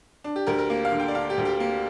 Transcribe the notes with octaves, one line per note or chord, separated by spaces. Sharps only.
D4
G4
D2 A#4
A#4
A#3
F5
D3
G5
D5
D4 F5
G4
D2
G4
A#3